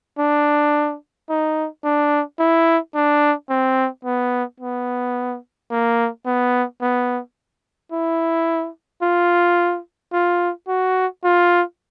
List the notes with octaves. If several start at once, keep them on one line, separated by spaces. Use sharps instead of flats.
D4
D#4
D4
E4
D4
C4
B3
B3
A#3
B3
B3
E4
F4
F4
F#4
F4